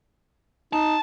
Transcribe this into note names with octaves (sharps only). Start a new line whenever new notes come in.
D#4 A5